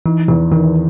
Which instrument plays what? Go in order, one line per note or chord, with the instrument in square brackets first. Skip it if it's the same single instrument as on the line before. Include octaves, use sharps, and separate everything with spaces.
[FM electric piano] E3 [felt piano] D#4
[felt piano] E2 [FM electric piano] E3
[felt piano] D#3 [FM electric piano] E3